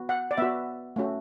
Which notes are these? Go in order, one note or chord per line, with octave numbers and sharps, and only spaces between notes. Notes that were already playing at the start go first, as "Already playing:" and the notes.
Already playing: B3 F#4
F#5
D5
B3 F#4 E5
A3 C#4 F#4